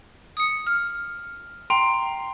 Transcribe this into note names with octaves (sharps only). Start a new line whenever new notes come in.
D#6 C#7
F6
G5 A#5 C6